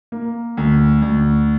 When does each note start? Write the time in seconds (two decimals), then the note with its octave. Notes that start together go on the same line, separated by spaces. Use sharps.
0.12 A#3
0.57 D2
1.02 D2